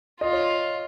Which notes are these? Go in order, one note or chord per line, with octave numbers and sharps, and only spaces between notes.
F4 D#5
C#5